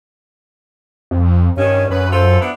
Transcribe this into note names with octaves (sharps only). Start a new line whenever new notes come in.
F2
G2 D#3 C#4 C#5
F#2 C#4 B4
F4 A4 C5
B3 D4 E4